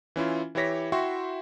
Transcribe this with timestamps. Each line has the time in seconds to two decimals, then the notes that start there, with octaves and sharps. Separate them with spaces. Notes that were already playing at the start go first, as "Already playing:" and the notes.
0.16 E3 C#4 E4 F4
0.55 E3 E4 G4 C#5 A#6 B6
0.92 E4 F#4 E5 G5 C6 C#6